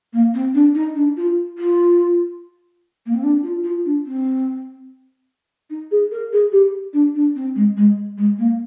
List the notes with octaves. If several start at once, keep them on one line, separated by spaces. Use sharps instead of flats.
A#3
C4
D4
D#4
D4
F4
F4
A#3
C4
D4
F4
F4
D4
C4
D#4
G#4
A#4
G#4
G4
D4
D4
C4
G#3
G#3
G#3
A#3